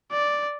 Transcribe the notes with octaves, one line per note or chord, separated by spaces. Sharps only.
D5